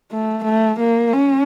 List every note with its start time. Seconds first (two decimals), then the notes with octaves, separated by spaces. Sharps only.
0.11 A3
0.45 A3
0.79 A#3
1.13 C#4